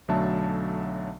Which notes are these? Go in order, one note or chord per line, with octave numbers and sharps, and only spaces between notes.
B1 D3 F#3 A3 E5 A5